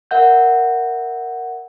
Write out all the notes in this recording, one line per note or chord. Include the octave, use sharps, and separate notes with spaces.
A#4 E5 F#5 G6